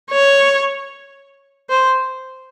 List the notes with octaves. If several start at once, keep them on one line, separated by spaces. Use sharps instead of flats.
C#5
C5